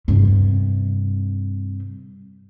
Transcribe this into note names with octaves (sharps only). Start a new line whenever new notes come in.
G2 C3